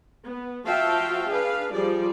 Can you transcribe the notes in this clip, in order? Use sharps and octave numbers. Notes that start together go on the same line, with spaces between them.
B3
F3 F#4 E5 F5 G5 A5
D4 G#4 B4 F5
F3 G3 G#4 D5